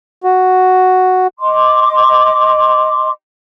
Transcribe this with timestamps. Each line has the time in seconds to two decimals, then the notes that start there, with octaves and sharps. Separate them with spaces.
0.24 F#4
1.39 D#5 C6 D6